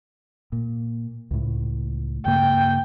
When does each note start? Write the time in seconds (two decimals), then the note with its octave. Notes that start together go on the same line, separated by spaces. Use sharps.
0.52 A#2
1.31 C#2 A2
2.26 G2 C#3 A#3 G5